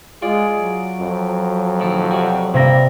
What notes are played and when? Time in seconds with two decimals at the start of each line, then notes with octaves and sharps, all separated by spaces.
0.22 G#3 F4 G#4 D5
0.57 F#3
1.00 F2
1.80 A#1 D#3 A4
2.11 C3 G3 F#4
2.54 G2 C3 G3 A#3 A#6